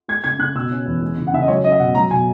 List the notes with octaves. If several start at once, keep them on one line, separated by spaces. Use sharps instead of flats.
G#3 G#6
C#3 G#6
C#3 F#6
B2 E6
C#4
E2
G#3
C#3
F#5
C#3 E5
D#5
F#3 C#5
C#4 D#5
E5
B2 F#5
F#3 A#5
B2 G#5